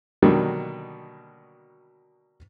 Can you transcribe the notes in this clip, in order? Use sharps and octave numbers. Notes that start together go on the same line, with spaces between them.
B2 D3 D#3 F#3 G3 A#3